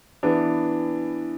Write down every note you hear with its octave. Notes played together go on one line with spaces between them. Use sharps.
E3 B3 D4